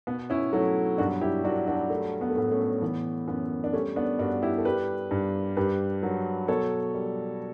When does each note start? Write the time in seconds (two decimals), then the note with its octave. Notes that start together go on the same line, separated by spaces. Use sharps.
0.07 B2 B3
0.30 C#4 E4
0.53 F#3 A3 C#4
0.98 G2 D4 F#4
1.21 E4 G4
1.44 F#3 D4 F#4
1.67 D4 F#4
1.90 G3 A3
2.21 B3
2.30 A3
2.36 A2 B3
2.51 A3 C#4
2.82 E3 B3
3.28 F#2 B3
3.64 D4
3.73 G3 A3 C#4
3.96 B3 D4
4.19 G2 D4 F#4
4.42 E4 G4
4.58 A4
4.65 G3 G4 B4
5.11 G2
5.57 G2 G4 B4
6.03 F#3
6.48 B2 A4 C#5
6.94 G3